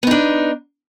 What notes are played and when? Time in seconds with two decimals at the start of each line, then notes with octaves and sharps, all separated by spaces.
0.03 B3
0.07 D#4
0.11 D4